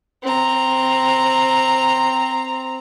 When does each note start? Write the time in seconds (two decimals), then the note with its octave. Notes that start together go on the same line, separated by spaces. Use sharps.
0.23 C4 A#5